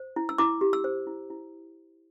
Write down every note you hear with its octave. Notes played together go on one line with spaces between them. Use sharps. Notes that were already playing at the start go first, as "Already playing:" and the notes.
Already playing: C5
E4
E6
E4 D6
G4
E6
C5
E4
E4